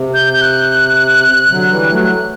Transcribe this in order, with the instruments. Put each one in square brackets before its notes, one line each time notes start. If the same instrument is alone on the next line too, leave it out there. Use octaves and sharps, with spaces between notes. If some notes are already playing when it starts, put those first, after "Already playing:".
Already playing: [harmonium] C3
[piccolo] G6
G6
F#6
[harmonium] D3 F#3
E3 G3
F#3 A3